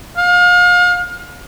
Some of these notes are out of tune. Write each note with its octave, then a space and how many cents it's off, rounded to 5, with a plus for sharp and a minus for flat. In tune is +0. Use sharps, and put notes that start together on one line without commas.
F5 +35